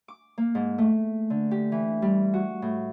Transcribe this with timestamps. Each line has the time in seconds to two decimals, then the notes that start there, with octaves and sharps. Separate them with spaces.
0.08 D6
0.38 A#3
0.55 G#2
0.78 A3
1.30 D3
1.51 G4
1.72 E3
2.02 G3
2.34 F#4
2.62 A2